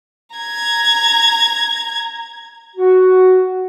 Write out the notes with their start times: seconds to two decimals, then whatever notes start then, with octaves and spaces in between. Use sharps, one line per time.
0.36 A#5 G#6
2.76 F#4